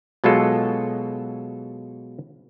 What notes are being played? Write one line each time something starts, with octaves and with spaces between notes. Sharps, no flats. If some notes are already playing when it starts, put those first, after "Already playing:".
B2 F#3 G#3 F4 A4